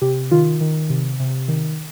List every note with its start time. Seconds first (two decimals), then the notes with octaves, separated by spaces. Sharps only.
0.01 C3 G4
0.31 D#3 F4
0.61 D#3
0.90 C3
1.20 C3
1.48 D#3